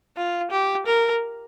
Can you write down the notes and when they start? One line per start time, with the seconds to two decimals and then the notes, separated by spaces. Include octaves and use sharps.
0.17 F4
0.51 G4
0.86 A#4